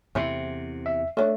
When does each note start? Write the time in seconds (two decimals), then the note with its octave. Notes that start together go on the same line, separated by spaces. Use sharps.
0.15 E2 C3 A3 C4 E4
0.86 E5
1.17 A3 C#4 D4